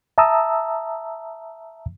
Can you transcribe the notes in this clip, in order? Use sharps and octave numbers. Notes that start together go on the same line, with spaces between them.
E5 A5 A#5 D#6 E6